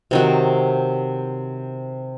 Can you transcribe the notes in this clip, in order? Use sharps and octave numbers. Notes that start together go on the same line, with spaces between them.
C3 D#3 F#3